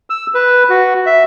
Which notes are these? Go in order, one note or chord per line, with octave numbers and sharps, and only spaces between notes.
E6
B4
F#4
E5